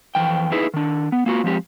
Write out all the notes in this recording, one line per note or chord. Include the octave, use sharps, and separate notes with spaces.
F2 E3 G5
D#4 E4 G#4 B4
D#3 D4
B3
A#3 F4 F#4
F3 G#3 C4 G4